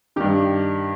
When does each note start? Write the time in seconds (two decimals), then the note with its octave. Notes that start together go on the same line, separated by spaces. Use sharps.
0.16 G2 D#3 G4